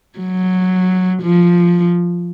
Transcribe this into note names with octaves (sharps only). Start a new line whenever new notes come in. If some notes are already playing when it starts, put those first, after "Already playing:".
F#3
F3